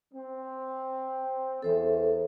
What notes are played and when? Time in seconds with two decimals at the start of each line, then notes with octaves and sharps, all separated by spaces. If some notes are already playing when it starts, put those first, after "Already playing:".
0.14 C4
1.62 E2 E3 A4 C5 E5